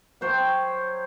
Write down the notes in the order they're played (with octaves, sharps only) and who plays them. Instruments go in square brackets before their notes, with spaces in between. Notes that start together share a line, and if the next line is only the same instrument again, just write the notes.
[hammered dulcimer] F#3 C5 C#5 G5